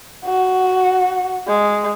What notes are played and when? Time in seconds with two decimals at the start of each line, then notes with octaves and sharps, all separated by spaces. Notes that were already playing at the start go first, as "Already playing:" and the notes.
0.25 F#4
1.48 G#3